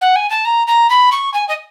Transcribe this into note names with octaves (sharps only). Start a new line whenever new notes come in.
F#5
G#5
A5
A#5
A#5
B5
C#6
G#5
D#5